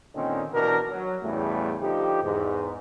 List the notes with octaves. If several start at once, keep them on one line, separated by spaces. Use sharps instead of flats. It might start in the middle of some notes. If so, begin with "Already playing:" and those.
A#2 D3 D#3 C4 C#4 D#4
D#2 B2 E3 D4 A#4
F#3
E2 A2 C#3 G3 A3
D3 F3 D#4 G4
E2 G#2